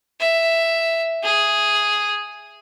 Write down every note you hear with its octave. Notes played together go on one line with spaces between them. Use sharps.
E5
G#4